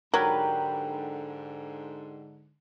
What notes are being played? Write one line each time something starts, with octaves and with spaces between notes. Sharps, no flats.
G#2 D3 F#3 G4 A#4 B4